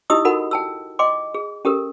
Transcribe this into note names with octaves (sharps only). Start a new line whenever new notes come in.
D#4 E4 G4 D#5 D#6 E6
D#4 F#4 A4 A#4 F#5 B5
G5 A5 E6
D#5 G5 C6 D6
G#4
C#4 G4 A4 A#4